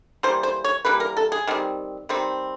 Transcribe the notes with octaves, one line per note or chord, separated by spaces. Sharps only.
E3 G3 A#3 C5
C5
C#5
E3 G3 A#3 B4
A#4
A4
G#4
D#3 G3 C4
D#3 G3 C4